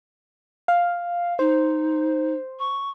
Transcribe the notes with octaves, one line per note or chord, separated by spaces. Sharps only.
F5
D#4 C5
C#6